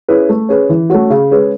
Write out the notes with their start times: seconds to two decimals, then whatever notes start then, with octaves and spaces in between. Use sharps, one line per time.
0.08 C#4 E4 G#4 B4
0.29 A3
0.49 C#4 G#4 B4
0.69 E3
0.90 A3 C#4 F#4
1.10 C#3
1.31 G#3 C#4 G#4 B4